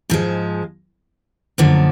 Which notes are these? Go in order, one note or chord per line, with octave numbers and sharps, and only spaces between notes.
G#2 F3 G#3
F#2 D3 F3 A#3